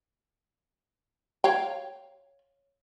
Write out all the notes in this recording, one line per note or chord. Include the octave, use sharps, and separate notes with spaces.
C#5 F5 G5